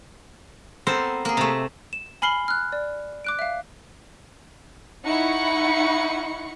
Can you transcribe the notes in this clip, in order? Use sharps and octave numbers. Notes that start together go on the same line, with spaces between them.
B3 C4 A4 A#4 C5
A#3 G#4
C3 A3
E7
G#5 B5 F6 C7 F#7 G7
F6 F#6
D5
D6 F#6 D7
E5 F5
D#4 E4 F#5 B5 C#6 C#7